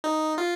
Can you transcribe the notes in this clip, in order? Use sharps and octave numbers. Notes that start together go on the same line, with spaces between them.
D#4
F4